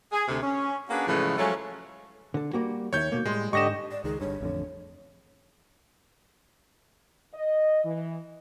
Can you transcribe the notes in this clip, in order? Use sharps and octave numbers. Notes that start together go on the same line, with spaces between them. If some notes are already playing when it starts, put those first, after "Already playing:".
G#4
D2 C3
C#4
A#3 C#4 D4 F#4 G#4 B4
A2 C#3 E3 F3 G#3 A3
F3 F#3 G#3 A3 C#4
D3 A4
G3 A#3 F#4
D#2 D#3 C#5 E5 G6
B2 A3 A#3
A2 G3 G#3 C6
G#2 D3 G4 D#5 C#6 A#6 E7
D5
C#2 D#3 G#4
G1 G2 C#5
A1 F2 D3
D#5
E3